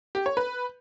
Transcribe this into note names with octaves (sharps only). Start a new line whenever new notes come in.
G4
C#5
B4